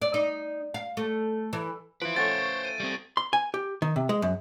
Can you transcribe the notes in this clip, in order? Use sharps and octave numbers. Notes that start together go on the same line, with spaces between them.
D5
D#4
F5
A3
E3
F3 E4 B4 D7
A3 C#4 C5 C#5 F#5 A6
D#7
G3 C4
C6
G#5
G4
D#3
C3
G#3
F#2